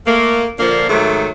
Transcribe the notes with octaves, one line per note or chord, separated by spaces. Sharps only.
A3 A#3
A#2 D3 F3 A#3 D4
G#2 D#3 F#3 A3 E5